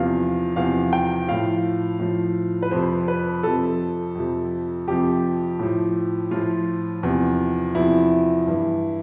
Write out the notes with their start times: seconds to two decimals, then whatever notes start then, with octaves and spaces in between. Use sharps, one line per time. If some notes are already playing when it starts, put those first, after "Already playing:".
Already playing: E2 C3 F3 F5
0.56 E2 C3 F3 F5
0.93 G5
1.28 A2 F3 F5
2.00 A2 F3
2.62 B4
2.71 F2 C3 F3 C5
3.08 B4
3.43 F2 C3 F3 A4
4.15 F2 C3 F3
4.87 F2 C3 F3 G4
5.60 A2 F3
6.31 A2 F3 F4
7.03 E2 C3 F3
7.75 E2 C3 F3 E4
8.47 G2 E3